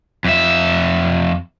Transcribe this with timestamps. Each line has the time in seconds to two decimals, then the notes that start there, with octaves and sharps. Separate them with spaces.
0.25 F2 E5